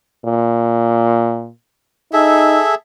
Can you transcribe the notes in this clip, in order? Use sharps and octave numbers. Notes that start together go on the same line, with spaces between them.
A#2
D#4 G#4 A4 E5